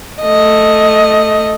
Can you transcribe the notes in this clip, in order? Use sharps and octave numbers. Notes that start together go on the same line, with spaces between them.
A3 D#5